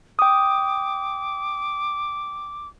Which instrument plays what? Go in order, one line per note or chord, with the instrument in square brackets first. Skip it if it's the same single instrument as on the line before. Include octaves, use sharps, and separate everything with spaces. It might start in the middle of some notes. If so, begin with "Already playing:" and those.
[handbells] G5 D#6 [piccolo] D6